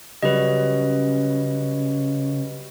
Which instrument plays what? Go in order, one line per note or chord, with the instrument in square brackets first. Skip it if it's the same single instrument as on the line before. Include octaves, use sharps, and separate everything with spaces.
[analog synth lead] C#3 [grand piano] F#3 G3 C#4 [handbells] B4 D#5